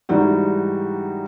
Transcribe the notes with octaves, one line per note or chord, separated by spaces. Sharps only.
G#2 E3 G3 D#4 F#4